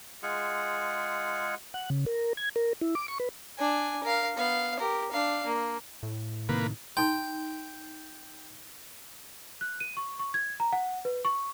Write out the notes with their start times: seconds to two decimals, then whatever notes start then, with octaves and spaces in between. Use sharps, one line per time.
0.23 G#3 F4 G#4 F#5
1.74 F#5
1.90 C#3
2.06 A#4
2.37 G#6
2.56 A#4
2.81 E4
2.95 D6
3.08 C#6
3.20 B4
3.59 D4 G#5
4.03 A#4 F5
4.36 B3 F5
4.80 G4 A#4
5.11 D4 F5
5.46 A#3
6.03 A2
6.49 C3 D#3 A#3 B4
6.97 D#4 G5 C6
9.61 F#6
9.80 D#7
9.97 C#6
10.19 C#6
10.34 G#6
10.60 A#5
10.73 F#5
11.05 B4
11.25 C#6